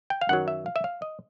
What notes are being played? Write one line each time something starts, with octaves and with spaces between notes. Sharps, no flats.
G5
F5
F#2 D#3 F#3 F#5
E5
F5
E5
F5
D#5